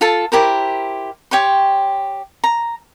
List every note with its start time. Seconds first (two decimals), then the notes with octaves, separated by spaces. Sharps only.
0.01 F4 A4 A5
0.32 E4 G4 A#4 C5
1.31 G4 C#5 G5 C6
2.44 A#5